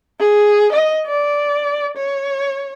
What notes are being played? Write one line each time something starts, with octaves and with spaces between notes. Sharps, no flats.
G#4
D#5
D5
C#5